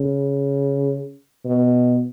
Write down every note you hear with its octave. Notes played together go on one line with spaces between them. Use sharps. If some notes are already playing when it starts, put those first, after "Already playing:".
Already playing: C#3
B2